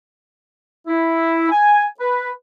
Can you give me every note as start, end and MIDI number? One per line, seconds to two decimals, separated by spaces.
0.88 1.50 64
1.51 1.85 80
2.00 2.30 71